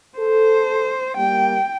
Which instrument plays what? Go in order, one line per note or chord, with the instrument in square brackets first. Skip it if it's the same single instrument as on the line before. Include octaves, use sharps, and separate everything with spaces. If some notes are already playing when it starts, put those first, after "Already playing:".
[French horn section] A4 [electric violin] C5
[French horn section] G3 A#3 [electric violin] G5